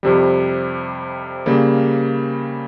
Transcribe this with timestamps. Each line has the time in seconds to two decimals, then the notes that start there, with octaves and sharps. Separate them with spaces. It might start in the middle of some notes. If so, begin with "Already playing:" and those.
0.03 F2 C3 G3
1.46 C#3 G3 A#3